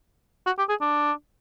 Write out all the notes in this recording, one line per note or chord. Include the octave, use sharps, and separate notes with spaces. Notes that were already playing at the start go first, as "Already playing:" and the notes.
F#4
G4
G#4
D4